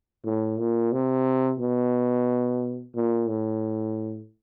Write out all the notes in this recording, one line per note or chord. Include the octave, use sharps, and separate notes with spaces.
A2
A#2
C3
B2
A#2
A2